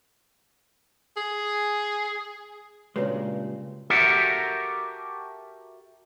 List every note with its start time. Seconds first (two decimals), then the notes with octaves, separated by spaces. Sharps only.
1.17 G#4
2.96 G2 A#2 C#3 G#3 F#4 B4 C#5
3.90 F#4 G4 A4 A#4 E5 F#5